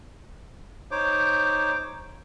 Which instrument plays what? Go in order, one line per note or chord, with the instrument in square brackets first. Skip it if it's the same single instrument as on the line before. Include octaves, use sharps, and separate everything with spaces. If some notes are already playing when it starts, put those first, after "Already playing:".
[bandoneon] D#4 C5 C#5 D6